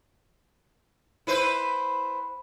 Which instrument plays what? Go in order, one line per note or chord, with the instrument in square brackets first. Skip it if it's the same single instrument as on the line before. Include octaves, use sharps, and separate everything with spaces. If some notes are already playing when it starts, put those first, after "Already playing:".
[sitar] E4 B4 C5